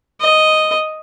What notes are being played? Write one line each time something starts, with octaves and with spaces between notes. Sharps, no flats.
D#5